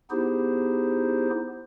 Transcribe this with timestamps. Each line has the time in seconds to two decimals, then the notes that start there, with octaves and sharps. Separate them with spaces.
0.11 B3 D#4 E4 G4 G#4 C5